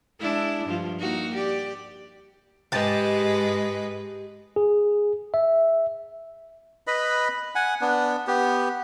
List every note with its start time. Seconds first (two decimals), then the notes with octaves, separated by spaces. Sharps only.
0.20 G#3 D4 E4
0.66 G2 F3 F4
0.99 A#3 D#4 F#4
1.34 G4 D5
2.72 G#2 G#3 G4 B4 A5
4.56 G#4
5.34 E5
6.87 B4 D#5 B5
7.55 F#5 G#5
7.81 B3 D4
8.27 B3 G4